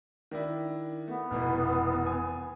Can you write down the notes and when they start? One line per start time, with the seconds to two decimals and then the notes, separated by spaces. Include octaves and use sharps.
0.31 D#3 D4 E4
1.08 A3 B3
1.31 F1 B2 E3
2.06 G#5